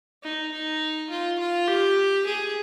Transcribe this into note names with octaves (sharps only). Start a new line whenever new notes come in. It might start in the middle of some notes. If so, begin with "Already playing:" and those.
D#4
D#4
F4
F4
G4
G#4